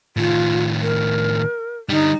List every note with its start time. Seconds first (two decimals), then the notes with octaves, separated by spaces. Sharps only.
0.17 A2 D#3 F4
0.82 A#4
1.89 D3 G3 D#4